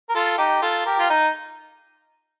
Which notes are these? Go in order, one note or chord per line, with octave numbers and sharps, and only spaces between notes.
A#4
F4 A4
D#4 G4
F4 A4
G4 A#4
F4
D#4